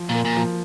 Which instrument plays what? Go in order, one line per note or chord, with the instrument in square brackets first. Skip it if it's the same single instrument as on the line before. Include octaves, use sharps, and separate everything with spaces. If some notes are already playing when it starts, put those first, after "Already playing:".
Already playing: [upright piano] F3
[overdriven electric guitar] A#2 [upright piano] A#3
[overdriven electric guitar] A#2
[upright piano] F3